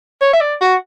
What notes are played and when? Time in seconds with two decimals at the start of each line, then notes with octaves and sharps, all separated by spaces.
0.22 C#5
0.33 E5
0.41 D5
0.61 F#4